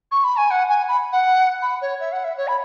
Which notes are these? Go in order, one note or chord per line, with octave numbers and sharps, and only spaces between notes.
C#6
B5
G#5
F#5
G#5
B5
F#5
B5
C#5
E5
F#5
E5
C#5
B5